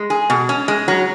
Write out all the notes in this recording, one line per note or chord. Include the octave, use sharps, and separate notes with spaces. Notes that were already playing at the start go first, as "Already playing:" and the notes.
Already playing: G#3
G#4
B2
C#4
G#3
F#3